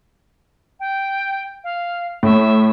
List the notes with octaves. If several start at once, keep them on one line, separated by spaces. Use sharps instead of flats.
G5
F5
A2 E5